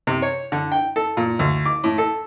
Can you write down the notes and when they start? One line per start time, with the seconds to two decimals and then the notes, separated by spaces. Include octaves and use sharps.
0.07 C3
0.22 C#5
0.52 D3
0.72 G5
0.96 A4
1.17 A#2
1.39 D2
1.66 D6
1.84 A2
1.98 A4